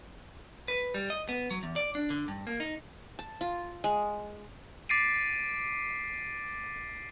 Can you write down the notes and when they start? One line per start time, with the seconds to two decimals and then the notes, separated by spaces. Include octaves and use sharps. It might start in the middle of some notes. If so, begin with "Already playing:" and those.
0.68 B4
0.94 G3
1.10 D#5
1.29 B3
1.51 F#3
1.63 E2
1.76 D5
1.95 D4
2.10 D3
2.28 G2
2.47 A#3
2.60 D#4
3.19 A5
3.41 F4
3.84 G#3
4.89 D6 A6 B6 C7 D7 D#7